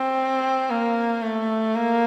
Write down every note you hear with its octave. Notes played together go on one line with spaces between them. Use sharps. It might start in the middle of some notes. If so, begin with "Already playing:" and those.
Already playing: C4
A#3
A3
A#3